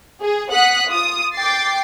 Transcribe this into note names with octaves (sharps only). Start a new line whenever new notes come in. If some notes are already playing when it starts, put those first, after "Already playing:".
G#4
F#5 D#6 F#6 B6
F4 D#6
G5 D6 A6 C7